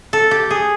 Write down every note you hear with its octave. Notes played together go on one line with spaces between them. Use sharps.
A4
G4
G#4